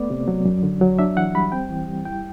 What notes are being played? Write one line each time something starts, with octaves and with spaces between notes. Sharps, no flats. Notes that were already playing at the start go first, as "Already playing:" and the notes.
Already playing: A3 B3 D5
C3
F#3
F#2
D3
F#3
D4 E5
E3 F#5
G3 B5
C4 G5
E3
G3
E4 G5